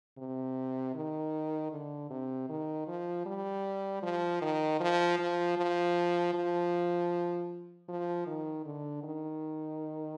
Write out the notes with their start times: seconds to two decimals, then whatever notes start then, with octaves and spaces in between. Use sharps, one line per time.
0.18 C3
0.95 D#3
1.72 D3
2.10 C3
2.49 D#3
2.88 F3
3.26 G3
4.03 F3
4.42 D#3
4.80 F3
5.19 F3
5.57 F3
6.34 F3
7.89 F3
8.27 D#3
8.66 D3
9.03 D#3